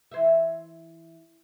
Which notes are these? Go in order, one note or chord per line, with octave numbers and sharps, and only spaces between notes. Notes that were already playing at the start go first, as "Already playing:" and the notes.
E3 C5 E5